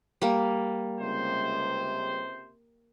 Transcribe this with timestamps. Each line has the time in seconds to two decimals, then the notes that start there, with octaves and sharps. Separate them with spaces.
0.22 G3 A#3
1.00 C#2 C3 C5